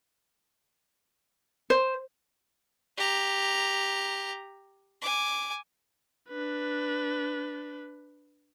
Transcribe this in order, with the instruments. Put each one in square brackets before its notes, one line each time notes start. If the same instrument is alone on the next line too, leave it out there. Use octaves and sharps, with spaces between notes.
[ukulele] C5
[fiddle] G4 A#5
G#5 D6
[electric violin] D4 B4